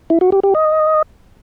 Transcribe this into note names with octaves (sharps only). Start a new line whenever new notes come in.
E4
F#4
G4
G4
D#5